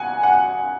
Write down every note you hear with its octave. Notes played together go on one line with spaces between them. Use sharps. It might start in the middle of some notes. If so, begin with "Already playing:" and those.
Already playing: D#2 C#3 F#5 G#5
F#5